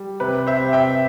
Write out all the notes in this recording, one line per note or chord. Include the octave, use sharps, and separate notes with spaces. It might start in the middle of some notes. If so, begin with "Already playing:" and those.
Already playing: G3
C3 B4
C5 E5
C3
E5 G5